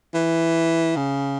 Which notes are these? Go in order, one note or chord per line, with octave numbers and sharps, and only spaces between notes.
E3
C#3